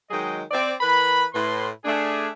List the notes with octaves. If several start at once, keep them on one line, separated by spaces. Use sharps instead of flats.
D#3 F#3 G#3 G#4 D#5 G5
C4 D5
E3 A#4 B4 B5
A2 B4 C6
A3 D4 G#4